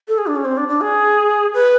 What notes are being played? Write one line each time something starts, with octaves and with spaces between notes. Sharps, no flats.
A4
G#4
D4
C#4
C4
D4
D4
G#4
B4